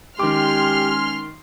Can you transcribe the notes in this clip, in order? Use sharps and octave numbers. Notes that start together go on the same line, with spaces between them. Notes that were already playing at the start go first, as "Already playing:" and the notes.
D#3 G#3 C#4 G4 C6 D6 F6